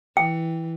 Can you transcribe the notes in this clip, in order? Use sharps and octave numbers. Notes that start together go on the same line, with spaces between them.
E3 G5